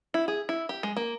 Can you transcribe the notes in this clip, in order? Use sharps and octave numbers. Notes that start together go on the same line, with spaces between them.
E4
G#4
E4
G4
G#3
A#3